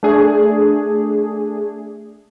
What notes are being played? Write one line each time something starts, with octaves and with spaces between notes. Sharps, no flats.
A3 D4 G#4